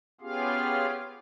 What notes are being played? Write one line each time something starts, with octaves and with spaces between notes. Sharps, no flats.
B3 C#4 F4 G4 G#4 F5